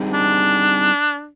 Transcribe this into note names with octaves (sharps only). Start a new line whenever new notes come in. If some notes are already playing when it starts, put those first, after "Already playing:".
Already playing: G3 C4 D#4 G#4
D4